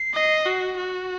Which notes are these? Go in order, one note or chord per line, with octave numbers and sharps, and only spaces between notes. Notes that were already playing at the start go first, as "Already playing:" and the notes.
Already playing: C7
D#5
F#4
F#4